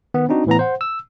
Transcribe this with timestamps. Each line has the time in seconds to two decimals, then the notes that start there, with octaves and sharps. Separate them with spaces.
0.14 D#3 B3
0.29 C4 D4 D#4 F#4
0.47 A2 E3 B3 A#5
0.59 C5 F#5
0.81 E6